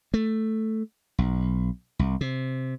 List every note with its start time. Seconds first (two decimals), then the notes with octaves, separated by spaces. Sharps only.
0.14 A3
1.19 B1
1.99 C2
2.21 C3